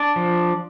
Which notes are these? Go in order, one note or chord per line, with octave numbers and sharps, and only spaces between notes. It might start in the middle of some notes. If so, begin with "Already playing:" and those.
Already playing: D4 D5
F3